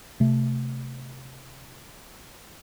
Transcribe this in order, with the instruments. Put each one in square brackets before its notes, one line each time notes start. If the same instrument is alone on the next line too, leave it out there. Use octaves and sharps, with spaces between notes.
[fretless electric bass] C3 A3